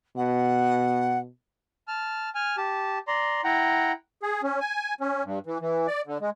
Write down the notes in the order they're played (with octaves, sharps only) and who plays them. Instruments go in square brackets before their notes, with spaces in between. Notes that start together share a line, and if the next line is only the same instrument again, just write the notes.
[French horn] B2 [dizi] F#5
[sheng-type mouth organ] A5 F6
G#5 F6
G4 A5
D5 A#5 C6
E4 F#5 G5 A#5
[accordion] G#4
C#4
G#5
C#4
G2
E3
E3
D5
D3
G#3